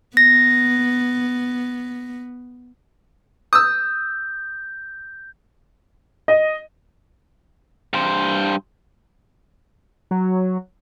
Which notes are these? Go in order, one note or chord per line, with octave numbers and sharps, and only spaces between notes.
B3 A#6
D#6 E6 G6
D#5
G2 C5
F#3